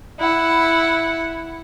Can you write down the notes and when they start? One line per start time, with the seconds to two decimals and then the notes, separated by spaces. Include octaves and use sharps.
0.19 E4 F#5